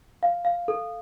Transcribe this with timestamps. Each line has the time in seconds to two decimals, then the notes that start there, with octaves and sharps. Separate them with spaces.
0.23 F5
0.45 F5
0.68 A4